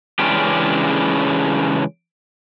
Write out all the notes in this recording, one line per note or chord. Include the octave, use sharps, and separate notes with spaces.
C#3 E3 G#3 C#4 D4 G4